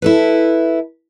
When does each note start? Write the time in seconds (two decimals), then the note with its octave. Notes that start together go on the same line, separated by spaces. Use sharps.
0.02 E4 A4 B4